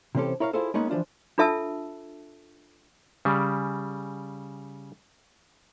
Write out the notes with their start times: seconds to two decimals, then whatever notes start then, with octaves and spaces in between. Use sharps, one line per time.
0.15 C3 E3 C4 C#4 G4 A4
0.40 E4 A#4 C#5 D5 F5
0.53 E4 F4 G#4 A4 C5
0.74 G#3 A#3 B3 C#4 D#4 B4
0.89 E3 F3 D4 F4
1.38 D4 F4 A4 E5 A5 E6
3.25 C#3 G3